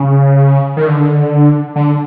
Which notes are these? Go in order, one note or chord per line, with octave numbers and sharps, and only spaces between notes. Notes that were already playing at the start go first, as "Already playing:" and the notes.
Already playing: C#3
D#3
D3
D3